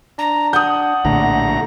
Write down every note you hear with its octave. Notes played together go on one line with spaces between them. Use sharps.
D4 A#5
F#5 D#6 G6
A#1 A2 D3 A3 A#5